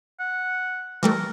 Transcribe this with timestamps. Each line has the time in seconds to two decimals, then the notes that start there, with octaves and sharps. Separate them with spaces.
0.19 F#5
1.03 E3 G3 A3 A#4